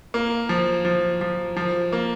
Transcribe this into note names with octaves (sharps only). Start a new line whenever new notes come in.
A#3
F3
F3
F3
F3
A#3